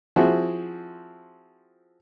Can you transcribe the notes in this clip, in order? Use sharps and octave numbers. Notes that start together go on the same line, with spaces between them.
F3 C4 E4 F#4 G#4